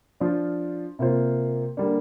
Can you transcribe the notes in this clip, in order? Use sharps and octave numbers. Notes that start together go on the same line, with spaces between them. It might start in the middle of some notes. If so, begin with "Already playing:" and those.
F3 D4 F4
C3 A#3 F4 C5
D3 G3 A#3 D4